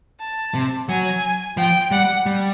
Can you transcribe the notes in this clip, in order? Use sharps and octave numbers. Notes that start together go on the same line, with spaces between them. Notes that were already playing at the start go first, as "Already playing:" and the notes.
A5
C3
F#3 G#5
F3 G5
G3 F#5
G3